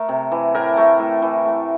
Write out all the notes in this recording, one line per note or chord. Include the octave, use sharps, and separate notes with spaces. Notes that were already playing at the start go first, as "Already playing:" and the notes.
Already playing: A3 A#4
C3
E3
A2 A#4
A3
A2
E3
A3